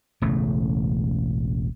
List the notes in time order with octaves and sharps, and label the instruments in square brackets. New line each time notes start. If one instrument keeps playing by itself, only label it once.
[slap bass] E1 A1 C#3 A3